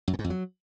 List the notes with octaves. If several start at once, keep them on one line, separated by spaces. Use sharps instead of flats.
F#2
A#2
G#2
F2
F#3